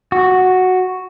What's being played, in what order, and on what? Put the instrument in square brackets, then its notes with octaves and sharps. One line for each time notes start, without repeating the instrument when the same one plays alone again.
[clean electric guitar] F#4